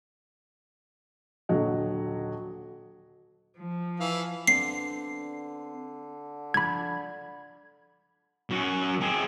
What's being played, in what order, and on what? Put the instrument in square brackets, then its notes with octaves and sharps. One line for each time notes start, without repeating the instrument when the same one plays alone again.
[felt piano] D#1 D3 F#3 D#5
[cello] F3
[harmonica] E3 F5
[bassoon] D3 [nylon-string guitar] B3 C4 D4 [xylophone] C7
[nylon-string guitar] F3 D4 A4 [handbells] B5 G#6
[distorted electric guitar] F#2 F#4
C4 G#4